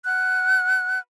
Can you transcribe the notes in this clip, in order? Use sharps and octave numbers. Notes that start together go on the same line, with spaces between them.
F#5 F6 F#6